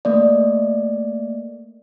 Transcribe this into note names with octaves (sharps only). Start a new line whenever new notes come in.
A3 A#3 D5